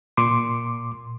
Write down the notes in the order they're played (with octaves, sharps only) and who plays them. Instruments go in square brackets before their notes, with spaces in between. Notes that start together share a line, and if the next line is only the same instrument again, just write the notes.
[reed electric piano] A#2 C6 D6